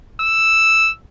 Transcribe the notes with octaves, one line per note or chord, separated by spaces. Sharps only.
E6